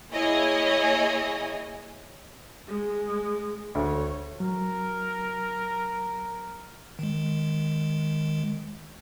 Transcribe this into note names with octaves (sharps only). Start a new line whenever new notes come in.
A#3 E4 G#4 C#5 D#5 G#5
G#3
D2 C#5
F#3 A#4
D#3 G#3